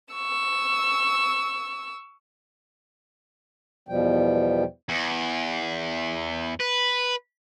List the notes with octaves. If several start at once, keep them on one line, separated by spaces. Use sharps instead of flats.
C#6 E6
E2 B2 F3 G3 G5
E2
B4